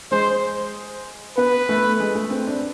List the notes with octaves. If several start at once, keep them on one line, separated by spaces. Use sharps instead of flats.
G#3 C5
B3 B4
A3
G#3
A3
C4
D4